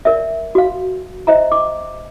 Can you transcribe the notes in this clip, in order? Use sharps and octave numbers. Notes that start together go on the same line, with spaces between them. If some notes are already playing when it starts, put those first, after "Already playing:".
A#4 D5 E5
F#4 F5
C5 D#5 E5 A#5
D6